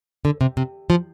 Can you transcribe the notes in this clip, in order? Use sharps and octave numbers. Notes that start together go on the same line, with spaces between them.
D3
C3
C3
F3